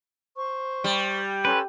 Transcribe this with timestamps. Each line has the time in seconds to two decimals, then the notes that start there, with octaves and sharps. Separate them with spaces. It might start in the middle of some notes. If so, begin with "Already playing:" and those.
0.37 C5 C#6
0.84 G3
1.45 C#4 A4 B4 C6